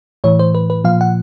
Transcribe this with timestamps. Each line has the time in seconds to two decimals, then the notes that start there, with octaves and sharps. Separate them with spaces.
0.24 A2 E3 C#5
0.39 C5
0.55 B4
0.70 B4
0.84 A#2 F3 F5
1.01 F#5